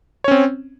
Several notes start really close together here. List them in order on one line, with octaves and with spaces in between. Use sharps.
C#5 C#4 C4